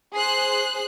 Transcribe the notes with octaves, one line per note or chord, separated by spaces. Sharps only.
G#4 C5 F#6 C7